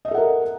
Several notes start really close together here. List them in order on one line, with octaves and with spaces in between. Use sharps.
D#5 E5 A4 F#5 A#4